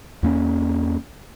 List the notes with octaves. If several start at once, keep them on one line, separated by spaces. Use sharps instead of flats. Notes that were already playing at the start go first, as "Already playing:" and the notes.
E2 A#3 C#4